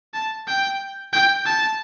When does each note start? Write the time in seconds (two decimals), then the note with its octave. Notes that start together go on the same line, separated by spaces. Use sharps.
0.14 A5
0.47 G5
1.13 G5
1.45 A5